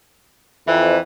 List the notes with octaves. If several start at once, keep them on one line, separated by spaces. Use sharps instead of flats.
F2 E3